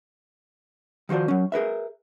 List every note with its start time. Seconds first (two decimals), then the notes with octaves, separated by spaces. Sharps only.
1.09 D#3 F3 F#4 C5 D5
1.28 F#3 C#4
1.52 G#4 A#4 B4 E5